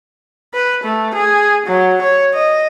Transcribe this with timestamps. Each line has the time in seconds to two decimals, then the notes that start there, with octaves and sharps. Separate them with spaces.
0.54 B4
0.84 A3
1.15 G#4
1.67 F#3
2.02 C#5
2.34 D#5